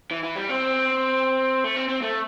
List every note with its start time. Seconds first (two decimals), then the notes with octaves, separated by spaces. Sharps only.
0.11 E3
0.23 E3
0.35 G3
0.49 C4
1.64 A3
1.76 C4
1.88 C4
2.02 A3